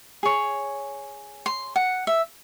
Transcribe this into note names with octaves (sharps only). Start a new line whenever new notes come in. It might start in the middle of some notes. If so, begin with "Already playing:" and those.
G#4 C#5
C6
F#5
E5